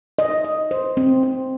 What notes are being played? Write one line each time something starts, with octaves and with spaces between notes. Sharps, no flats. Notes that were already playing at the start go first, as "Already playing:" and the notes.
D#5
D#5
C5
C4
C4